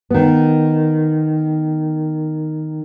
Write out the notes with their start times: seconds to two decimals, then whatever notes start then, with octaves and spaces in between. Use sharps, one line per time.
0.10 D#3 B3